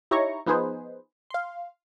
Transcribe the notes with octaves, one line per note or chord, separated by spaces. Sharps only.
D#4 E4 G4 C#5 A#5 C#6
F3 B3 D#4 G#4 B4 C5
F5 C6